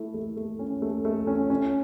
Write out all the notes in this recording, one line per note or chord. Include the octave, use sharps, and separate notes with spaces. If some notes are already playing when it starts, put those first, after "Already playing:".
Already playing: A3 E4
A3
A3
C#4
A3
A3
C#4
C#4